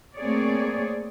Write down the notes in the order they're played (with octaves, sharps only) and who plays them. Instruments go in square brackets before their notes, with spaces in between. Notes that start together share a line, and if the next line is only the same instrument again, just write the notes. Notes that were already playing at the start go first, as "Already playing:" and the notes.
[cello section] A3 A#3 C4 G#4 C#5 D5